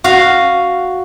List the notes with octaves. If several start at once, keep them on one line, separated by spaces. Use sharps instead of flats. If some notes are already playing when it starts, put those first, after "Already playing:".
F#4 F5